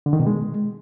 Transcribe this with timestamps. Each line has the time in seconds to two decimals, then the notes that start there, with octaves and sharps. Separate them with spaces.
0.06 D3
0.13 D#3
0.20 B2
0.27 G#3